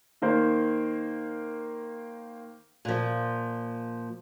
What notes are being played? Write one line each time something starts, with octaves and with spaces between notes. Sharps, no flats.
D#3 A#3 C5
A#2 F3